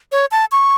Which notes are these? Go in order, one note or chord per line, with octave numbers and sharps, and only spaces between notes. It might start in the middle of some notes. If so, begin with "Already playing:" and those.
C#5
A5
C#6